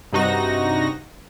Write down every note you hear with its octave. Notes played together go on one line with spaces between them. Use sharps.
G2 C3 D#4 F#4 A#6